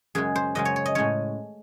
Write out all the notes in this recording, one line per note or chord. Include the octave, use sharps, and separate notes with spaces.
F#2 C#3 G#3 G#4
C5
F#2 C#3 G#3 D#5
C#5
C#5
D#5
A2 G#3 C#4 C#5